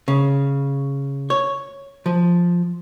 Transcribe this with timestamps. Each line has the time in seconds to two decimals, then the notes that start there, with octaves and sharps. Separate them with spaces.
0.08 C#3
1.30 C#5
2.06 F3